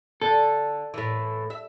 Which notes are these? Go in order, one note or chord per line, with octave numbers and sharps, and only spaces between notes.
D3 A4
A2 E3
E5